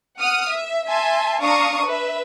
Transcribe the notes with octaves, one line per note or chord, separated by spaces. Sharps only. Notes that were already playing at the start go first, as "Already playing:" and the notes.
F#5 D#6 F6
E5
E5 G#5 A5 C6
D4 F5 A#5 C#6 D#6
B4 E5